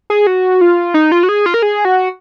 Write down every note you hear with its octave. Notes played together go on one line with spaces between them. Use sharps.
G#4
F#4
F4
D#4
F4
F#4
G#4
F4
A#4
G#4
F#4